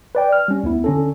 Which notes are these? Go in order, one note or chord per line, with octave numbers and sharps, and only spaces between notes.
B4 D5 G5
F6
G3 C#4
D2 B3 E4
D3 C#4 A4